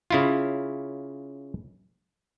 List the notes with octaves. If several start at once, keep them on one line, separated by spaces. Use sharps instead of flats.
C#3 E4 F4